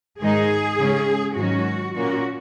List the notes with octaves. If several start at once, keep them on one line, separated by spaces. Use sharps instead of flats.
G#2 D#3 G#3 D#4 G#4
C#3 G#3 C#4
G#2 D#3 F#3 C#4 F#4
A#2 A#3 C#4 F#4